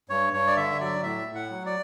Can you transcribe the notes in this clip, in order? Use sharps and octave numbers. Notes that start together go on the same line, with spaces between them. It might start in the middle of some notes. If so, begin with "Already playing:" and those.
G2 C#5
G2 C#5
D5
D3 E5
F#3 D5
A2 E5
A2
F#5
F#3
D5